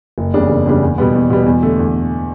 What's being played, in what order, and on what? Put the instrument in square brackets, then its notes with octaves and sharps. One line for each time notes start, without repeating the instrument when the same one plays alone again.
[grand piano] F#1
E2 C#3 G3 D4
F#1
E2 C#3 G3 D4
E2
B2 G3 B3
E2
B2 G3 B3
E2
D3 A3
E2